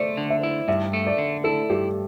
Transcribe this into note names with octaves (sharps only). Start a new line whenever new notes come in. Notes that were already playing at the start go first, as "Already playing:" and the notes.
Already playing: A3 C5 D5
D3
E5
E4
G2 E5
A3
D5
D3
E4 A4
G2 G4